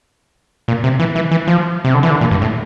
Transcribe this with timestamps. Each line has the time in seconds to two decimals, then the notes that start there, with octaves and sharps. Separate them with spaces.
0.68 A#2
0.84 C3
1.00 E3
1.16 E3
1.31 E3
1.47 F3
1.85 C3
1.94 D3
2.03 E3
2.10 D3
2.21 A#2
2.31 G2
2.42 A2